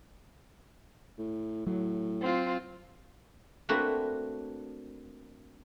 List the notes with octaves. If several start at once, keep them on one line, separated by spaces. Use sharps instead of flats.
A2
A2 F#3
C4 F4
A3 A#3 C4 D4 F#4 B4